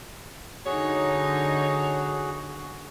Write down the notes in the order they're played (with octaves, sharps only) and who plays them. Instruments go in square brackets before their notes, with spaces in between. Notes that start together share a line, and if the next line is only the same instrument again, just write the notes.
[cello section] D3 D#4 [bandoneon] F#4 G#4 [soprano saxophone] C#5